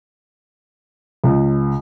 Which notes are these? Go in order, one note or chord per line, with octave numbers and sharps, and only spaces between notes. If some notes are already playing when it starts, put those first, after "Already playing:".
C#2